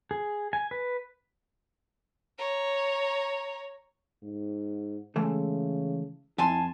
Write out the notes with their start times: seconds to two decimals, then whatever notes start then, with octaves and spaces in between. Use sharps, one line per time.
0.11 G#4
0.53 G#5
0.71 B4
2.38 C#5 A#5
4.23 G#2
5.16 C#3 E3 G#3 A3
6.38 F2 E4 G#5 A5 C6